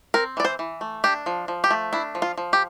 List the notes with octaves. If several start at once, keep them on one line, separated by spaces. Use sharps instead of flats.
C4 A#4
E3 D5
C5
E3
A3
D4 G4
F3
F3
G4
A3
D4 E4
F3
F4
F3
G4